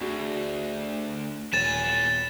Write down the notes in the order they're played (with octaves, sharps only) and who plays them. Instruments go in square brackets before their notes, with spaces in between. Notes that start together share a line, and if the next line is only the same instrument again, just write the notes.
[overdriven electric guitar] D2 [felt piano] F#4 G#4
[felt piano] D#1 [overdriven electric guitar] B3 G#5 [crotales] A6 E7